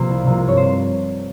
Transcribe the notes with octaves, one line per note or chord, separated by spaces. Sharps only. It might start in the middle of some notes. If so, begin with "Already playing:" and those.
Already playing: C3 F3 A#3 C5
C2
C3 F3 A#3
G2 C#5
C5